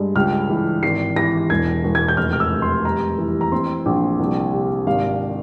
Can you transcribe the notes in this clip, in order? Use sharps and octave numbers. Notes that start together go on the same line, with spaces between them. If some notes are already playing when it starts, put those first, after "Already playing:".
Already playing: G2 G#3
C#2 F6
E3
G#1 C7
E3 A#6
E1 G#6
E1
G#6
G6
F1 F6
F6
E6
F1
C6
G3 A#5
E3
A#5
C4 C6
A#1
C2
C3
G#1 F5